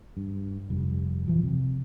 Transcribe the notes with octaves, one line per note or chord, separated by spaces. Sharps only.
G2
F1 G3
D#1 E3 F3
C3